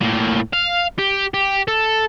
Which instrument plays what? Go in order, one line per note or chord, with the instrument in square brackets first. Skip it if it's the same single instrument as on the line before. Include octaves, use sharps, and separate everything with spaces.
[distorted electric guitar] A2 A#3
F5
G4
G4
A4